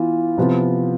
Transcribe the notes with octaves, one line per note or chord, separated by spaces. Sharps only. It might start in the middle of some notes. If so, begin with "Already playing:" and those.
Already playing: E3 B3 F4
C3 F3 B3 F4